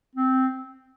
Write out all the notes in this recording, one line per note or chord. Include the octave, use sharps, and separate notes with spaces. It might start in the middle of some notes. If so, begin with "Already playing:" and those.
C4